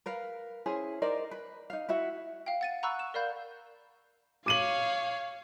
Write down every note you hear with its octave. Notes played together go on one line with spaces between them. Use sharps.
A#4 B4 F5
C#4 E4 G#4 C5
D#4 A#4 C5 D5
B4
D#4 F5
E4 F#4 E5 F#5
F5 G5
F#5 A6 D#7
F#5 A#5 B5 C#6 E6 F#6
E7
A#4 D5 F5 B5 G6
C#5 F5 D6 D#7 F#7